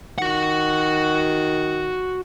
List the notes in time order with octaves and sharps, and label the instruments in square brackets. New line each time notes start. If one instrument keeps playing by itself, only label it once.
[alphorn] D#3 [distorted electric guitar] F#4 F#5